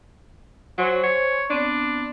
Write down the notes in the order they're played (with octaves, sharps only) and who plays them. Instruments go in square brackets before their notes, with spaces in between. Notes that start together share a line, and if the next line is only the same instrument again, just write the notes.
[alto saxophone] F#3 [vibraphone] C5 G#5 C6
[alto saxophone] C#5
[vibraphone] B3 C4 [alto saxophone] D4